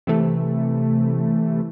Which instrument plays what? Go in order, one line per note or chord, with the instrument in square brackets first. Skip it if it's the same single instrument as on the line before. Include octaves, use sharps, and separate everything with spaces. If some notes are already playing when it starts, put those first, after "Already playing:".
[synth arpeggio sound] C3 E3 A3